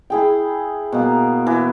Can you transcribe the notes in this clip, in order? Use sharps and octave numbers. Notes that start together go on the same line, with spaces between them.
E4 G#4 G5
B2 A#3
E3